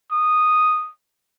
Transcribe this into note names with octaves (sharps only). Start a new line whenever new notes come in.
D#6